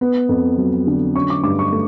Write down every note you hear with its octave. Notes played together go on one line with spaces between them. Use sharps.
B3
F2
F#3
D3
C#4 C#6
D6
G2 D6
C#6
A3